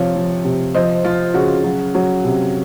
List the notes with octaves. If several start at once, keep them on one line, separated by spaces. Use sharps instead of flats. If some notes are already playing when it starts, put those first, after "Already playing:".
Already playing: C3 F3 C#5 F5
F3
C3
F3 C5 D#5
F3 F4
C#3 F#4
F#3
F#3
C3